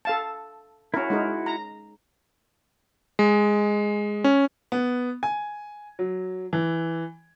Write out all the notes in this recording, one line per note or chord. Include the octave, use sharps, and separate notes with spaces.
A4 F5 A5
C#4 E4 F#4 A#4
G#3 D#4 A#4
A#5
G#3
C#4
B3
G#5
F#3
E3